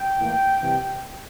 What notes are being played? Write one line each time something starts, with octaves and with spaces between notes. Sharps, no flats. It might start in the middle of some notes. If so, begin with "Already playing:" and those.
Already playing: G5
A2 E3 A#3
C3 E3 G3